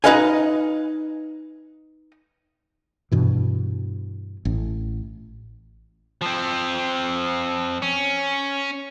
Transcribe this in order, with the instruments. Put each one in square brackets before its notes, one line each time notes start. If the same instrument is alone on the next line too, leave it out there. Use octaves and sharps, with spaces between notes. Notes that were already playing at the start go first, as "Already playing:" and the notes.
[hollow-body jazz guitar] D#4 F#4 B4 D#5 F5 G#5
[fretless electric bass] G2 B2 E3
A1
[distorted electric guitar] F3 C4
C#4